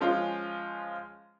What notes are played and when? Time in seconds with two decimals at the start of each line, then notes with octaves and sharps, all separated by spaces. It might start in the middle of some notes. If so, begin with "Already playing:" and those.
0.01 F3 G#3 C#4 F4